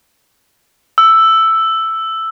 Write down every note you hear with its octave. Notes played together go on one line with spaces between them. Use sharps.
E6